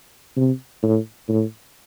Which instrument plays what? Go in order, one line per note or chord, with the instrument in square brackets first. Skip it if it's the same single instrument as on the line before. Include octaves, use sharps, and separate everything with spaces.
[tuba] C3
A2
A2